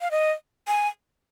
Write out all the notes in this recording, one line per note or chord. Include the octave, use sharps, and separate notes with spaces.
F5
D#5
G#5